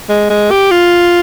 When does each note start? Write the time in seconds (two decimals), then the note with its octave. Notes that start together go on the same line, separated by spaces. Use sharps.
0.09 G#3
0.30 G#3
0.51 G4
0.71 F4